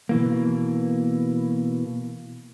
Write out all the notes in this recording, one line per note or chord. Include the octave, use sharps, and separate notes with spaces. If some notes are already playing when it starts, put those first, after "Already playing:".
B2 E3 A#3